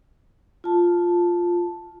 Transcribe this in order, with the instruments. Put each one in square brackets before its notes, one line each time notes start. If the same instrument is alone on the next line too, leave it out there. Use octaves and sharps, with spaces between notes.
[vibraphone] F4 A5